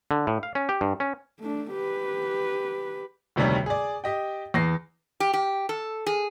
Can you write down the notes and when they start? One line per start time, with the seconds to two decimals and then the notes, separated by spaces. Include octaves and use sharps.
0.11 D3
0.27 A2
0.43 F5
0.55 C#4
0.69 G4
0.81 G2
1.00 C#4
1.39 A3 D4
1.71 G4 B4
3.36 F1 D2 C3 D#3 G3 C#5
3.66 G#4 D5
4.04 G4 D#5 G5
4.54 E2 A#6 C7
5.20 G4
5.33 G4
5.69 A4
6.06 G#4